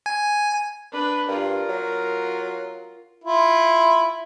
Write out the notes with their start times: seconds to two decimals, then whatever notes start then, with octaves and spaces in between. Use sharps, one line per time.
0.06 G#5
0.92 D4 B4
1.28 G2 F4 A#4
1.69 F#3
3.25 E4 F4